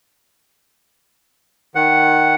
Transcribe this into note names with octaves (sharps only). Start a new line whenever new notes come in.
D#3 F#5